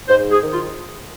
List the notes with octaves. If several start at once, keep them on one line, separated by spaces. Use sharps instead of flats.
G#2 C5
G#4
D#3
F4